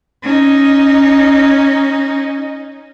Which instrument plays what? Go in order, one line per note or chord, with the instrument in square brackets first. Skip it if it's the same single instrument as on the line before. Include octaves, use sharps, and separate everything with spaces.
[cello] C#4 D#4